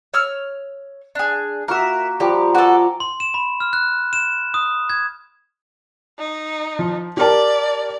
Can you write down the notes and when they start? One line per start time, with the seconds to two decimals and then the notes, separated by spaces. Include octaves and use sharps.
0.14 C#5 E6 F6
1.15 D4 G#4
1.68 A#3 F#4 A#4 E5
2.20 F3 G3 G4 A#5
2.55 F#4 A4 D5 G#5 A#5
3.00 C6
3.20 E7
3.34 B5
3.60 F6
3.73 F#6
4.13 E7
4.54 D#6
4.90 G#6
6.19 D#4
6.79 F3
7.17 G4 A#4 D5 A5